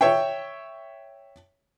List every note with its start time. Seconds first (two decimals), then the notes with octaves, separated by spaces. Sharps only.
0.01 C#5 E5 G5